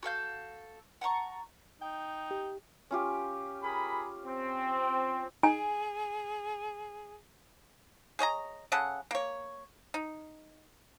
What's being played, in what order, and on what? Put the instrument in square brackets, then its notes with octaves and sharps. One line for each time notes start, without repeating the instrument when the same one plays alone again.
[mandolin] F#4 A4 F5 G6
F#5 A5 A#5 C#6
[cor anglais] D#4 [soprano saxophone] G5
[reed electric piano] G4
[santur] C#4 F4 G4
[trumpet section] G#4 A#4 B5
C4
[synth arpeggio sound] D#4 [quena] G#4 [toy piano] G#5
[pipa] G#4 C#5 D#5 A#5
C#3 G#4 A4 F#5
A#3 C#5
D#4